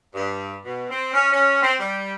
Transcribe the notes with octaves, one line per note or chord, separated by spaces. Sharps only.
G2
B2
C4
C#4
C#4
C4
G3